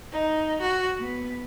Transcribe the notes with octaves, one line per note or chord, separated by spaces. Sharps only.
D#4
F#4
B3